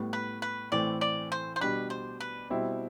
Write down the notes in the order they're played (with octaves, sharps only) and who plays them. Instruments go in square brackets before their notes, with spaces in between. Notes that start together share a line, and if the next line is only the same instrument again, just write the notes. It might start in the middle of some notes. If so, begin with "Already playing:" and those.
Already playing: [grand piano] A2 G3 B3
[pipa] B4
B4
[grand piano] A2 E3 A3 C4 [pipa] D5
[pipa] D5
C5
C5
[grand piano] B2 G3 D4 [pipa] B4
[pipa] C5
B4
[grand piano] B2 G3 C4 E4